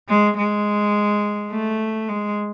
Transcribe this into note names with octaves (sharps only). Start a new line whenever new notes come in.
G#3
G#3
A3
G#3